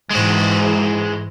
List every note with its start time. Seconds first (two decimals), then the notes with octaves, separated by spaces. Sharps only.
0.11 G#2 E3 G#3 F#4